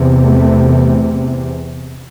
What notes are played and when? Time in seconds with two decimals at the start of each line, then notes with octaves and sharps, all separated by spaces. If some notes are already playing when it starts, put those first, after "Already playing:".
Already playing: E2 C3
0.25 A3